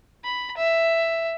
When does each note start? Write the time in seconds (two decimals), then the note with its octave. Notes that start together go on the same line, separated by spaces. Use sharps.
0.24 B5
0.57 E5